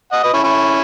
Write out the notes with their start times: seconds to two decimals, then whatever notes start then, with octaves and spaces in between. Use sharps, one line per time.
0.12 D#5 F#5
0.23 B4 D#5
0.33 C#4 E4
0.43 C#4 E4